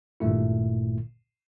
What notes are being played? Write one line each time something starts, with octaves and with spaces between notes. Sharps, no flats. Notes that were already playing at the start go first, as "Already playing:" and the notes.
G#1 G2 A#2 A3 E4